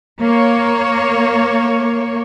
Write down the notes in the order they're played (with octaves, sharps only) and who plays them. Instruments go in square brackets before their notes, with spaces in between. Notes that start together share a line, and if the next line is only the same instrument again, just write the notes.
[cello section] A#3 C#5